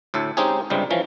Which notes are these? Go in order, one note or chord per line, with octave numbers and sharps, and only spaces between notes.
D2 A2 A4
G#3 C4 C#4 D#4 G4 G#4
C#2 G2 C3 G3 G#3
E3 F3 C#4